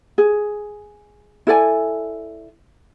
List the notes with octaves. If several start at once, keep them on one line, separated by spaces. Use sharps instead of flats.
G#4
E4 A4 D5 G#5